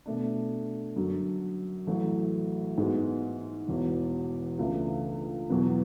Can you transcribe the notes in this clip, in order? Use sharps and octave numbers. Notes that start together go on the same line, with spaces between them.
B2 A3 D4
F#2 D3 F#3
A1 A2 F#3 A3
G#2 G#3 B3 F#4
E1 E2 B2
C#2 C#3 E3 A3 D4
E2 B2 F#3 B3